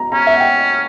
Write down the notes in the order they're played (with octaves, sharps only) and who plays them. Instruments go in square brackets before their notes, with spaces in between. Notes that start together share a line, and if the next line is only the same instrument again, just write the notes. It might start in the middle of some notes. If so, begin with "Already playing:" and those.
Already playing: [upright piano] A#5
[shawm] C#4 [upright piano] A#5
[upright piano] E5
F#5
G5